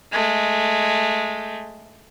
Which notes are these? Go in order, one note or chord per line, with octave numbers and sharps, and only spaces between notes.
G#3 A3